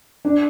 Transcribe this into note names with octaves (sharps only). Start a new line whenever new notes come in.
D4